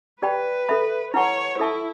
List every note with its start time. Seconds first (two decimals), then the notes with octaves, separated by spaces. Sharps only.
0.22 G4 B4 D5 G5 B5
0.69 A4 E5 B5
1.14 E4 B4 C#5 F#5 A5 C#6
1.59 E4 A4 E5 A5 C#6